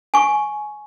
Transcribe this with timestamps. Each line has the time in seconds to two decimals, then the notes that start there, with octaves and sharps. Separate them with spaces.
0.14 G#5 C#6